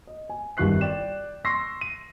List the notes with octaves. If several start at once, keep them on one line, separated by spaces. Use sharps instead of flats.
D#5
G#5
G1 C2 D#3 C#6 F#6 C7
D5 G5 E7
C6 C#6 E6 A#6 C7
D#7